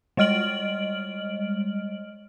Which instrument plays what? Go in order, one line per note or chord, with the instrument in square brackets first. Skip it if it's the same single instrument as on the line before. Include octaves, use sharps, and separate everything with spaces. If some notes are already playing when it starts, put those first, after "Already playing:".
[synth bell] G3 G#3 D#5 F6 D7 F#7